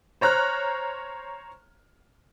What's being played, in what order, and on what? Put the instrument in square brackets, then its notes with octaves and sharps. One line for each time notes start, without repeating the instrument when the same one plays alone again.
[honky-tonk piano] C5 C#5 A#5 F6 F#6